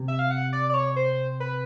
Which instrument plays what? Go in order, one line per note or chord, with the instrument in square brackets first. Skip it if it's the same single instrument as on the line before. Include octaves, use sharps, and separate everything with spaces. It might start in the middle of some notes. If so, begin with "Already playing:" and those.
Already playing: [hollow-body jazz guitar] C3
[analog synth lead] E5
F5
F#5
D5
D5
C#5
C5
B4